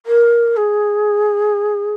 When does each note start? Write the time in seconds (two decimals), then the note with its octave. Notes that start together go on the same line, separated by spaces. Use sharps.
0.06 A#4
0.57 G#4